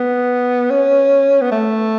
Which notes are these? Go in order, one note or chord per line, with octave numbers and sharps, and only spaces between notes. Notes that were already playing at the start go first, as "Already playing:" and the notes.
Already playing: B3
C#4
B3
A3